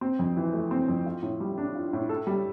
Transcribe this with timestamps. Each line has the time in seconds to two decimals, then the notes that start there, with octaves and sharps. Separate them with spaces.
0.01 C4
0.19 F2
0.37 E3
0.53 A3
0.71 C4
0.88 F2
1.06 F4
1.22 A2
1.40 G3
1.58 D4
1.75 F4
1.93 A2
2.09 A4
2.27 G3